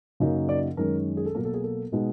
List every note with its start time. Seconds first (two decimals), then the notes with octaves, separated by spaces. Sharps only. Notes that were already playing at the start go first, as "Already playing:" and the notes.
0.20 F#2 C#3 F#3 A#3 D#4
0.49 D5
0.77 F#2 D#3 G#3 C#4 A#4
1.17 G#4
1.26 A4
1.35 B2 F#3 A#3 A#4
1.45 A4
1.54 G#4
1.64 A4
1.92 B2 G#3 B3 D#4